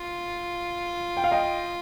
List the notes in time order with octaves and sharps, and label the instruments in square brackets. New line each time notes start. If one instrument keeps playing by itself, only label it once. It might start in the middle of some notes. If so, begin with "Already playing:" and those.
Already playing: [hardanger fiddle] F4
[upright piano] G5
F5
D#5 G5